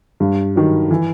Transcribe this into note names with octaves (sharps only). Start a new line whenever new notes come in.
G2
D#3 F#3
E3